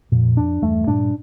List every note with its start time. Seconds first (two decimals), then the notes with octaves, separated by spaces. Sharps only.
0.12 F2 A#2
0.37 D4
0.62 E2 G2 A3
0.87 G2 A#2 D4